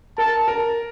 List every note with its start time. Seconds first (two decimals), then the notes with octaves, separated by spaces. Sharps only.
0.18 A#4 A5
0.48 A#4